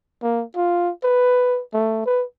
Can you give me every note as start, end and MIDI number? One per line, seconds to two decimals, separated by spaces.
0.22 0.44 58
0.56 0.91 65
1.03 1.61 71
1.74 2.02 57
2.06 2.24 71